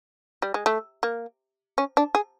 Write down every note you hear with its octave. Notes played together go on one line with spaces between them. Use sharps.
G3
G#3
A3
A#3
C#4
D4
G#4